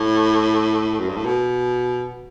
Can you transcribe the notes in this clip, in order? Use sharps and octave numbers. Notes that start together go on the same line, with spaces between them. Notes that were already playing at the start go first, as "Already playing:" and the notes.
Already playing: A2
F#2
G2
A2
B2